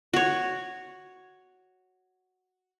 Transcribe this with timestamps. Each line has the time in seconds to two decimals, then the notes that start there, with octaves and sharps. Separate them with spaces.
0.13 F#4 C#5